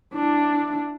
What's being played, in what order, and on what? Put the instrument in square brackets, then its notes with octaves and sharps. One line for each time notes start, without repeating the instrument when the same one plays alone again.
[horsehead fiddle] D4 E4